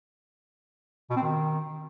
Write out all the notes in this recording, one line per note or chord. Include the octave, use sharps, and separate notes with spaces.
B2
C4
D#3